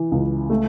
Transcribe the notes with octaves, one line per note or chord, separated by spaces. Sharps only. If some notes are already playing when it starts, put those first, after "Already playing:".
Already playing: E3
C#2
A3